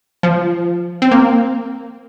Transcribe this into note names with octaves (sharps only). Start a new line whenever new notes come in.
F3
C4
A#3